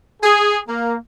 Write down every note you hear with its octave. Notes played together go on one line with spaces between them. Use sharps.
G#4
A#3